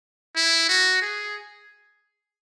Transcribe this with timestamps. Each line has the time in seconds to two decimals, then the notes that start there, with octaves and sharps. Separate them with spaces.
0.36 E4
0.69 F#4
1.02 G#4